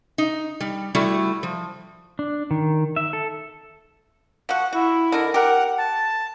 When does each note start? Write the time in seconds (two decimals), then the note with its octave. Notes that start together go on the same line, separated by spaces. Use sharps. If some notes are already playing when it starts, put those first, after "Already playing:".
0.18 D#4
0.60 G3
0.95 G3 A3 E4 F#4
1.43 F3
2.19 D4
2.51 D#3
2.96 E5
3.13 A4
4.49 F3 F#4 F#5
4.73 E4 F#4
5.12 D3 D#4 A#4
5.34 G4 A#4 F#5
5.77 A5